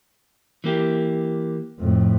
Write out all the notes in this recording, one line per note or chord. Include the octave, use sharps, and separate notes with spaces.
E3 A#3 G4
F2 A2